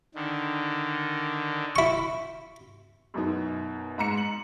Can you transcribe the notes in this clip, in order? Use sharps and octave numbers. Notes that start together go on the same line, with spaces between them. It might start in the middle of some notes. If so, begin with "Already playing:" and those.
D3 D#3
E4 C#6
F#2 B2 D#4
G#2 A#5 C#7
F#7